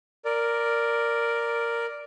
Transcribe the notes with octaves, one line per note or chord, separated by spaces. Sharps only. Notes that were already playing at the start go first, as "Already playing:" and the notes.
A#4 D5